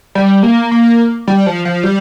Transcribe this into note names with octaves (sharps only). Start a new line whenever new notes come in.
G3
A#3
A#3
G3
F3
F3
G3